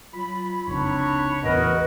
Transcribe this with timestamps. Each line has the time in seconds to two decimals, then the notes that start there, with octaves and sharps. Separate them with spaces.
0.13 F#3 F4 B5
0.67 F1 C#2 C4 D4 D#4 C#5
1.43 A1 E2 F#4 A#4 B4 D#5